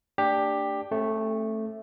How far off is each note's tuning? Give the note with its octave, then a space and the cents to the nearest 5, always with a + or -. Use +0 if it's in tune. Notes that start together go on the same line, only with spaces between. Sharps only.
A3 +35 D4 +0 G4 +10
A3 +0 C#4 -45